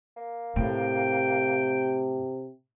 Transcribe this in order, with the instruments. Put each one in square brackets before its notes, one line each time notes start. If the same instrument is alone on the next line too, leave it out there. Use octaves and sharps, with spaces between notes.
[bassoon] A#3
[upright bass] A2 [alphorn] C3 [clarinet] G5